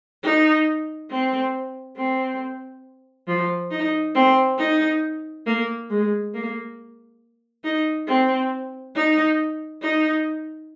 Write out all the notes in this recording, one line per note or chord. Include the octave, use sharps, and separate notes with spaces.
D#4
C4
C4
F3
D#4
C4
D#4
A#3
G#3
A#3
D#4
C4
D#4
D#4